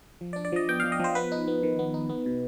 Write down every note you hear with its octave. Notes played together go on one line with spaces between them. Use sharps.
F3
D5
D4
D5
F3 D#5
B3 G5
F3 F5
D#5
F3 C5
B3 B4
D#4
B3
D#3
B3
D#4
B3
B2